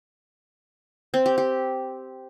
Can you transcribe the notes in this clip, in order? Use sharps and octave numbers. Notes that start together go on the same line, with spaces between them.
C4
G4
G4